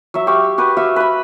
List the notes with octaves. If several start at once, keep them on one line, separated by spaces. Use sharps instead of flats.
F#3 E5
G4 F5 C#6
F#4 G4 B4
F#4 E5 F5
B4 B5